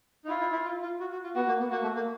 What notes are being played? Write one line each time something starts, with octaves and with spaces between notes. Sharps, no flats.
D#4
E4 F4
E4
E4
F4
F4
F#4
F#4
F4
B3 F#4
A#3
B3
A#3 F#4
A3
A#3